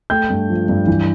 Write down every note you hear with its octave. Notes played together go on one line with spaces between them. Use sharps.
A3 G5 G6
G2
F3
G2
E3